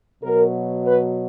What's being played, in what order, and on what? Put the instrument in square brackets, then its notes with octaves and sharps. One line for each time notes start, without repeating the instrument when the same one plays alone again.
[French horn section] B2 F#3 A#4
B4